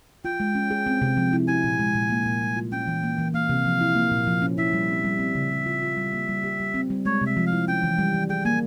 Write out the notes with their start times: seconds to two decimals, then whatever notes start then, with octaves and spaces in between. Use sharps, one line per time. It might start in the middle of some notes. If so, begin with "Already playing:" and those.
0.25 F4 G5
0.40 G#3
0.55 C#4
0.71 G#4
0.86 C4
1.02 C3
1.17 F3
1.33 E4
1.48 E4 G#5
1.64 A#2
1.79 G#3
1.94 A#2
2.10 A#3
2.26 A#2
2.41 G3
2.57 F4
2.72 C#4 G5
2.87 E3
3.03 A#3
3.18 E3
3.34 A#3 F5
3.49 C3
3.65 F3
3.81 E4
3.95 A#3
4.11 A#2
4.27 F3
4.42 C#4
4.58 E4 E5
4.73 G3
4.89 C4
5.04 G3
5.19 C4
5.35 C#3
5.51 G3
5.66 F4
5.82 F4
5.97 G3
6.13 A#3
6.29 G3
6.44 G4
6.60 G3
6.74 C4
6.90 G3
7.06 G#3 C#5
7.21 C3 E5
7.37 F3
7.47 F5
7.52 E4
7.68 C#4 G5
7.83 E3
7.98 G3
8.14 E3
8.29 G#4 G5
8.45 A#3 G#5